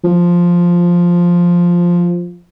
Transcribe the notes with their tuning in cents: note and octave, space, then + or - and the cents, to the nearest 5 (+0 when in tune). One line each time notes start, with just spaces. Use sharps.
F3 +0